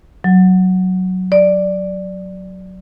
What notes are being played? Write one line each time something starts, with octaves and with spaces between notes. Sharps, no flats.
F#3
D5